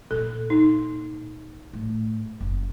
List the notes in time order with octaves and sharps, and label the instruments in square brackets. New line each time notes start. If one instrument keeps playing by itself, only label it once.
[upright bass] A#2 [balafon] A4
[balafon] D#4
[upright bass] A2
F#1